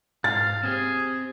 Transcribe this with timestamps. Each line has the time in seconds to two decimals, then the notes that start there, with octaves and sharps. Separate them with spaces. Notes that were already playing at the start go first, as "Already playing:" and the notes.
0.24 G#2 F5 A6
0.64 C4 G4 G#4